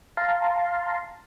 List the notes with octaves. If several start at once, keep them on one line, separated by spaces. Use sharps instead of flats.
F5 A5 A#5 C6